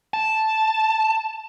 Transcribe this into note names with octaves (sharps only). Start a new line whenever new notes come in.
A5